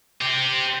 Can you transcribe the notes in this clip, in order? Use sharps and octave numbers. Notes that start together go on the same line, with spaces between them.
C4 G4